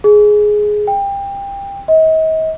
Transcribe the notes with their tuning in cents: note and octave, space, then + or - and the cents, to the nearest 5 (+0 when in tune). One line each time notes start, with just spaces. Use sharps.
G#4 +10
G5 +20
D#5 +40